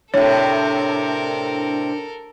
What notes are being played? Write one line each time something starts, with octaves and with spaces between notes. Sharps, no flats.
A2 C3 D4 A4 A#4 C#5